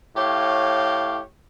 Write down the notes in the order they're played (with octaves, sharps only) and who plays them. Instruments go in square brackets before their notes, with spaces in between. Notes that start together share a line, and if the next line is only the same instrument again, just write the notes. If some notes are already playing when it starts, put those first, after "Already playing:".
[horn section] A2 G4 C#5 F5